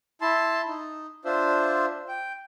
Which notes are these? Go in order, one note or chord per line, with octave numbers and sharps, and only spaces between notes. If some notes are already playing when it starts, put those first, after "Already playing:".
E4 A5 C6
D#4
D4 F4 C5 E5
G5